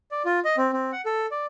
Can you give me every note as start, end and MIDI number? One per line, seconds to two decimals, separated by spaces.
0.11 0.22 74
0.25 0.40 65
0.45 0.56 75
0.57 0.71 60
0.73 0.91 60
0.92 1.01 78
1.05 1.26 69
1.31 1.46 74